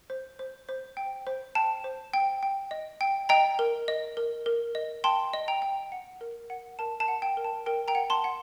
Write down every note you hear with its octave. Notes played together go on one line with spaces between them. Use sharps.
C5
C5
C5
G5
C5
G5 A5
C5
G5
G5
D#5
G5
D#5 G5 A#5
A#4
D#5
A#4
A#4
D#5
G5 A5 C6
D#5
G5 A#5
G5
F#5
A#4
F#5
A#4 A5
A5
F#5
G5
A#4
A5
A#4 G5
G5 A#5
F#5
A5 C6
F#5